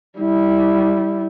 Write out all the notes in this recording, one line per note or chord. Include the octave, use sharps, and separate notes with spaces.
G3 E4